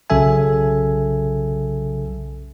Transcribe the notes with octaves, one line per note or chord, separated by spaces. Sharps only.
B1 C#3 F#3 A4 E5 G#5